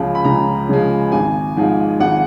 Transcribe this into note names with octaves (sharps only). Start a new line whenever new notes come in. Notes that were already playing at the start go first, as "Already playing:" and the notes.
Already playing: C#2 C#3 F3 G#3 B5
B5
C#2 A#5
C#3 F3 G#3
G#1 G#5
G#2 F3 G#3
G#1 F#5